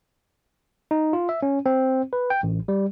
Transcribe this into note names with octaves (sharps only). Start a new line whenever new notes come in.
D#4
F4
E5
C#4
C4
B4
G5
A1
G3